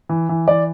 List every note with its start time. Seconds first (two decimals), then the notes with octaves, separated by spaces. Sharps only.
0.09 E3
0.29 E3
0.48 E3 D5